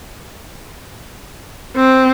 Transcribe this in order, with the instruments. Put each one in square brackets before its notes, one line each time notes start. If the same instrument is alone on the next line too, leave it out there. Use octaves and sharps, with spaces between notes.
[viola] C4